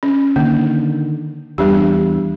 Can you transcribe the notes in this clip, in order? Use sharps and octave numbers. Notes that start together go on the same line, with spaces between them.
C#4
D3 D#3 A#3
E2 G3 D4 G4